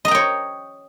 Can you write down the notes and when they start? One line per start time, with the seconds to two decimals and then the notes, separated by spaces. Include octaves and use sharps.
0.05 D#5
0.08 A#5
0.11 G5
0.15 C#5